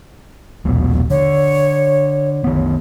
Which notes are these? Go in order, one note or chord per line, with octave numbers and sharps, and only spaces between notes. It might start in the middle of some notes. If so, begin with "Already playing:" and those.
D#1 A#1 B2
D3 C#5
D#3 B3